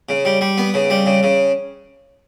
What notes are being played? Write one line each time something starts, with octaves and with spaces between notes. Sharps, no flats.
C#3
G3
G3
B3
C#3
G3
C#3
C#3